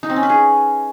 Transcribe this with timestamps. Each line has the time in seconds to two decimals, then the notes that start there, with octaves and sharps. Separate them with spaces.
0.03 D#4
0.10 C4
0.16 C#4
0.23 B4
0.29 G#4